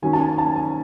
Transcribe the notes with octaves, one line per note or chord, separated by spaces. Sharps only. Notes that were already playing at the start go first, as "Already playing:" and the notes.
D#3 F#3 C#4 G#5
A5
G#5
A5
G#5